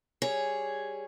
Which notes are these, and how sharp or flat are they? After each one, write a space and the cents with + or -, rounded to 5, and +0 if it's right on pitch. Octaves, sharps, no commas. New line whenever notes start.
G3 +0 G#4 +0 C#5 +0